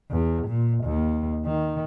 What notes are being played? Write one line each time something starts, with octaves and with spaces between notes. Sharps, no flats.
E2
A#2
D#2
D#3